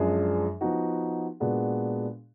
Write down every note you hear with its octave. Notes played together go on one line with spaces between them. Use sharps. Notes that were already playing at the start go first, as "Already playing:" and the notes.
Already playing: F#2 F3 G#3 D4 G#4
F3 B3 D#4 F#4
A#2 G#3 B3 D4 F#4